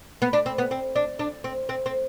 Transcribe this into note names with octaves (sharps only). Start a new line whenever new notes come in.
B3
D4
C4
B3
C4
D4
D4
C4
C4
C4